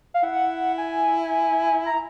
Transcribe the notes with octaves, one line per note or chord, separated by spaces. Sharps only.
F5
E4 F#5
G#5
A#5